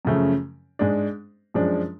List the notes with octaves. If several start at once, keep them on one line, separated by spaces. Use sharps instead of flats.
F#2 C#3 F3 A3
G#2 G#3 D4
F#2 F3 G#3 D4